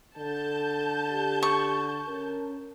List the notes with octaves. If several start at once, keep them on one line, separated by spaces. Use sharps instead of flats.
D3 A4 A5 G6
G4
C#6
C#4 A#4